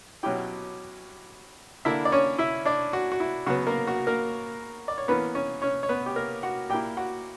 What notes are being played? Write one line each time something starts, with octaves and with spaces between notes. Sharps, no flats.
B2 F#3 C#4 E4 G4 G5
D3 A#3 D4 E4 E5
D5
C#4 C#5
E4 E5
D4 D5
F#4
F#4
E4
C#3 F#3 B3 F#4
A#3 A#4
F#4
A#3 A#4
D5
C#5
E3 A#3 B3 C#4 B4
C#4 C#5
C#4 C#5
C#5
B3 B4
G4
A#3 A#4
F#4 F#5
A#2 A#3 E4 G4 G5
F#4 F#5